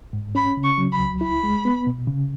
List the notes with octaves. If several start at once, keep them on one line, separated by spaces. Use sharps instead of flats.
G#2
C#4 B5
C#3
C#6
F#3
B5
C#2
E4 B5
G#3
B3
B2
C#3